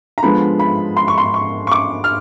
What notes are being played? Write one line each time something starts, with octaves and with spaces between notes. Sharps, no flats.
A#5
D3 F3 G#3 B3 B5
B5
C6
C#6
C6
C#6
C#6
D6
F6